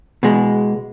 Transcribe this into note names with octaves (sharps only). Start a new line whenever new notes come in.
B2 G#3